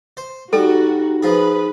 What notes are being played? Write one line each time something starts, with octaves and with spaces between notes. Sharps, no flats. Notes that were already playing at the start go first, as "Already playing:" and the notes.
C5
G3 D#4 F#4 A4
F3 G#4 B4